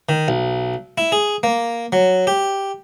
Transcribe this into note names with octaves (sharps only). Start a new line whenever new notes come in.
D#3
B1
E4
G#4
A#3
F#3
G4